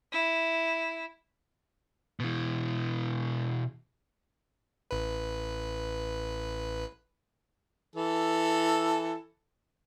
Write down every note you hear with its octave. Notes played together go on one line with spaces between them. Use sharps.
E4
B2 E3
A1 B4
E3 A4